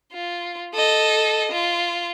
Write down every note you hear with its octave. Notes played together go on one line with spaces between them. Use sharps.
F4
A4 D#5
F4